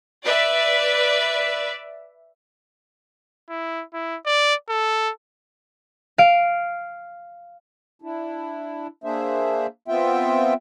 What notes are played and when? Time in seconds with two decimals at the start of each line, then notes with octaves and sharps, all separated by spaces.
0.24 B4 D5 E5
3.49 E4
3.93 E4
4.25 D5
4.69 A4
6.18 F5 D7
8.02 D4 E4
9.04 A#3 D4 G#4 C5 E5
9.88 B3 C4 F4 E5 G5